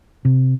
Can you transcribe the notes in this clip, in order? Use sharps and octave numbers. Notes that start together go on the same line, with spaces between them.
C3